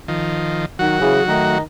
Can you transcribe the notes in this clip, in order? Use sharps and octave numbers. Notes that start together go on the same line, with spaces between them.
D#3 F3
D#3 F#3 F#4 F#5
C#3 E3 G#4
D#3 A3 D#4